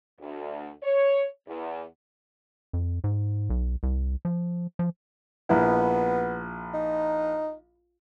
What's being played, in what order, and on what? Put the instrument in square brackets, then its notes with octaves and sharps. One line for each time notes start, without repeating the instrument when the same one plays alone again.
[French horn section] D2
C#5
E2
[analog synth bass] F2
G#2
B1
C2
F3
F3
[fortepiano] A#1 E4 [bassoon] B3
[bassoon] D#4